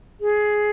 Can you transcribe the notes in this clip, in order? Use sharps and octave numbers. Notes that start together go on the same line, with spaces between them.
G#4